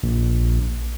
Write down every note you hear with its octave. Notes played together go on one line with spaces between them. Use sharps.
A#1